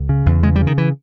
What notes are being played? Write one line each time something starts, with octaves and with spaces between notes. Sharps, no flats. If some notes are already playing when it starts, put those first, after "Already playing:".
Already playing: C#2
C#3
E2
C#3 G#3
G3
C#3
D#3
E3